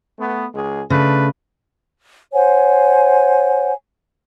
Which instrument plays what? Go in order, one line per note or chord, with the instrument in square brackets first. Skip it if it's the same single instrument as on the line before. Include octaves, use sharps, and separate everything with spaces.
[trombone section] A3 B3
C#2 G#3 G#4
[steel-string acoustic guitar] C#3 [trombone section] A3 D4 B4
[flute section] C5 C#5 F#5 G#5